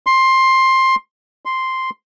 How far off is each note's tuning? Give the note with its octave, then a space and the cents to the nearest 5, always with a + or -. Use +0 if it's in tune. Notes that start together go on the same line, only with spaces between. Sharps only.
C6 +15
C6 +0